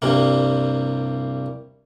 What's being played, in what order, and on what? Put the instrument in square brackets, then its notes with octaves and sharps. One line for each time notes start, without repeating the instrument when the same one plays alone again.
[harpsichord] C2 G2 C3 A#3